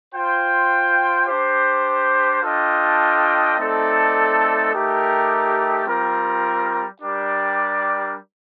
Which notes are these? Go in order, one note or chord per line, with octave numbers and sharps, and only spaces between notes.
F4 C5 G5
D4 G4 C5
D4 F4 A4 D#5 G5
A3 C4 D#4 A4 D5
A3 D#4 G4 A#4
G3 C4 F4 A#4
G3 D4 G4 A#4 D5